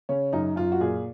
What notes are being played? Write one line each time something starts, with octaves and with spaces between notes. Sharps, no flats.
C#3 C#4
F#2 D#4
F#2 F4
F#4
A#2 G#4